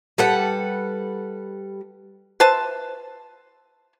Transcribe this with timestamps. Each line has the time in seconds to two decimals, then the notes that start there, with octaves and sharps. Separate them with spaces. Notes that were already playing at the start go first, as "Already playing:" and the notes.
0.18 G3 A4 B4 F#5
2.40 B4 C5 E5 A5